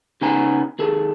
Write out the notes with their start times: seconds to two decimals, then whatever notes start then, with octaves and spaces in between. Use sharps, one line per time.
0.21 C#3 B3 D#4 B4 G#5 A#5
0.79 D#2 G#4 A4